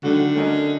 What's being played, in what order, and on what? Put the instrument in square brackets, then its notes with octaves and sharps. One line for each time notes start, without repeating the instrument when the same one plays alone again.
[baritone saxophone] D3 [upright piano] D#3 F#3 A3 D4 F#4
[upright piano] A3 C#4 F#4 A#4 D#5